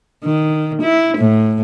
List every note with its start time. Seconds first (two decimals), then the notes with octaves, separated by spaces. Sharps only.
0.24 D#3
0.83 E4
1.18 A2